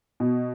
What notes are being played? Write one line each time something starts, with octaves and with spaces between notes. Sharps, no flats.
B2